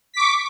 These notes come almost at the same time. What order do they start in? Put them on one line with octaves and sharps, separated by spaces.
B6 D6 C#6